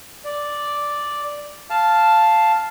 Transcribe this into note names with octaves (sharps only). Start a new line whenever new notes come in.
D5
F5 A5